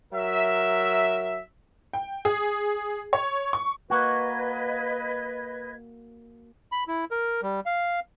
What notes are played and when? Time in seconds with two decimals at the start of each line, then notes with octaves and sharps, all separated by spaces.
0.13 F#3 A#4 E5
1.93 G5
2.25 G#4
3.13 C#5
3.53 C#6
3.90 A#3 F#4 B4 D#5 G#6
6.72 B5
6.88 E4
7.11 A#4
7.43 G3
7.66 F5